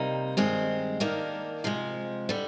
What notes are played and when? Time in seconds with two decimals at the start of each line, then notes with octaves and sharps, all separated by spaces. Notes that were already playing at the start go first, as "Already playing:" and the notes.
Already playing: C3 G3 A#3 D#4
0.37 G2 D#3 G#3 C4
1.00 D#3 A#3 D4
1.64 C3 F3 G#3
2.29 D3 G3